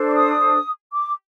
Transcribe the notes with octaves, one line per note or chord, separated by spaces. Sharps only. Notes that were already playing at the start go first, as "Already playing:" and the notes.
Already playing: D4 A4 C5
D6
D#6
D6